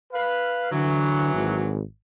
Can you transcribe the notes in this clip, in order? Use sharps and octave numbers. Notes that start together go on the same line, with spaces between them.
B4 F5
D3 E3 F#3
G#1